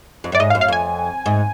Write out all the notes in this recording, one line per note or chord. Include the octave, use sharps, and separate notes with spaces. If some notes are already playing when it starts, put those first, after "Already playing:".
F2
F#2 D5
G#2 D#5
F5
F#2
F5
F2 G#5
G#2